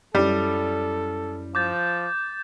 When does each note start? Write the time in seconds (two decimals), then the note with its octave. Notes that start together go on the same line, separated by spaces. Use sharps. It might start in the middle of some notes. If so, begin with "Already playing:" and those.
0.15 F#2 G3 C#4 E4 A4
1.55 F3 D6 G6 A6